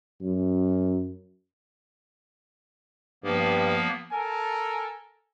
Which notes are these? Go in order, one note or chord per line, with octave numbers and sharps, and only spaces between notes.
F#2
G2 F3 A#3 B3
A4 A#4 G#5